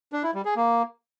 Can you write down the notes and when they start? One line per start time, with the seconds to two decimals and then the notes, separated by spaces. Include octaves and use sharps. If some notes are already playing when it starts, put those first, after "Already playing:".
0.13 D4
0.23 E4
0.34 G3
0.45 G#4
0.56 A#3